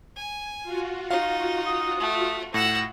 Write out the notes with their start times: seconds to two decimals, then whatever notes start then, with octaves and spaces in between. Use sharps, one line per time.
0.16 G#5
0.63 F4 F#4
1.11 D#4 F5
1.66 D#6
1.99 A3
2.54 A2 F#5 E6 A#6